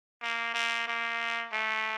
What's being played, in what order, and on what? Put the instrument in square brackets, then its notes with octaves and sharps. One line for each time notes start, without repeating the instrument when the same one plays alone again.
[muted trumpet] A#3
A#3
A#3
A3